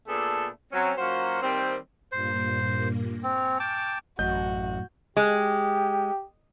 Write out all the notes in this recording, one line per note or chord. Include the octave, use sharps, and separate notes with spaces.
A#2 A3 B3 D4 G#4 A4
F#3 C4 C#4
F#3 A#3 C#4 F4 F#4 C5
D#3 G3 A#3 C4
G2 A#2 A#3 C5
C4 G#5 C#6 F6
G5 A5 D6
A1 F#2 A2 F#4 D#5 G6
G#3 G4